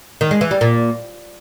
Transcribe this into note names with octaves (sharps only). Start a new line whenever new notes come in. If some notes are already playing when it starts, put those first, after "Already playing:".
D#3
G#3
E3
G3
A#2